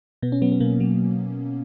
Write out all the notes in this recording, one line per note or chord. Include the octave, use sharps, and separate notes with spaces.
B2 B3
C#4
F#3 B3
B3
B2 A#3
F#3